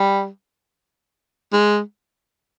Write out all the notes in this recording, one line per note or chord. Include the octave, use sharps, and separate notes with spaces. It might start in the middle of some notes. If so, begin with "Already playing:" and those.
Already playing: G3
G#3